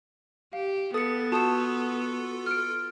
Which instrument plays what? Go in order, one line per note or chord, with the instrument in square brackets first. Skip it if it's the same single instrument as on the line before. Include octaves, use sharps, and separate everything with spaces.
[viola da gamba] G4 [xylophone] F5
[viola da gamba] B3 [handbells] A4 [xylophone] D#6 C#7 [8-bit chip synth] A6
[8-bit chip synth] F4 A4 [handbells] F#4 [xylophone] A5 D#6 E7
[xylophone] F6 D7